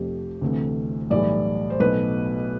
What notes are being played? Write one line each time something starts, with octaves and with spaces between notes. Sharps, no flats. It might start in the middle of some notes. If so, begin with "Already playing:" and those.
Already playing: F1 F2 C3 F3 A3 G4
D2 C3 E3 A3
B1 A2 E3 G3 D5
C5
B1 B2 A3 B4